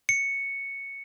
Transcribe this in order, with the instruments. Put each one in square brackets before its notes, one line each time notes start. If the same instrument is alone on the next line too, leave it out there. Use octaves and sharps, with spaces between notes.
[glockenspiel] C#7